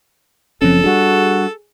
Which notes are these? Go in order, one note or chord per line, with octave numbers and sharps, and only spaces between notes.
F#1 F3 C4 C#4 A4
G3 D4 F#4 G#4